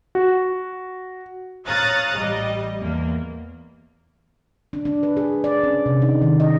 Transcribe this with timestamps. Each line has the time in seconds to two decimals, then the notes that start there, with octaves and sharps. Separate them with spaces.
0.15 F#4
1.67 C#5 F5 A#5 D#6 F#6 A6
2.18 A1 G3 D#5
2.81 E2 A#3
4.73 D4
4.85 D4
5.03 B4
5.17 G#4
5.44 D5
5.63 C#4
5.86 C3
6.02 D#4
6.22 D#3
6.40 D#5